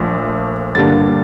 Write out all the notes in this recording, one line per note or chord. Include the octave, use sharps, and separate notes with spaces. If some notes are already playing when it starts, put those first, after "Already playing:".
Already playing: A#1 A#2 F3 A3
G2 D3 G3 A#3 D4 A6